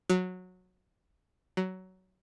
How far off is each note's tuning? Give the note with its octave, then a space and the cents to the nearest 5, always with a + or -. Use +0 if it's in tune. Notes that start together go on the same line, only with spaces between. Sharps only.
F#3 -15
F#3 +15